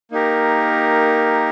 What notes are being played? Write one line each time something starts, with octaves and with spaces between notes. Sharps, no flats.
A#3 D#4 G4 A#4